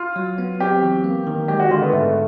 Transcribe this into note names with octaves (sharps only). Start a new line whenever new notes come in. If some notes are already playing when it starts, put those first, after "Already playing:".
Already playing: F4
F#3
B3
C4 G4
E3
A#3
D#3
G#3 G4
F#4
D3 F4
B3
G#2 A3